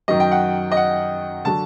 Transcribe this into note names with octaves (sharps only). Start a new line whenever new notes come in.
F#2 D#3 F#3 D#5
G5
F#5
D#5
F#5
D3 F#3 A5